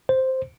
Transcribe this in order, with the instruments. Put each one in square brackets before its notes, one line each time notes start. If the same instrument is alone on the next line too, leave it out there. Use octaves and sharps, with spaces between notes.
[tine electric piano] C5